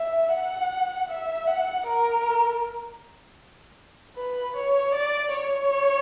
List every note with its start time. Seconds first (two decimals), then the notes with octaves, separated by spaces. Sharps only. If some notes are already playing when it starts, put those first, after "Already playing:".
Already playing: E5
0.33 F#5
1.10 E5
1.47 F#5
1.87 A#4
4.17 B4
4.56 C#5
4.95 D5
5.33 C#5